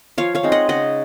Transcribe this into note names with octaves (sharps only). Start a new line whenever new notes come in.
F3 C#5 F5
C#5 F5
G#3 C4 D#4
D#5 F#5
C#3 D#5 F#5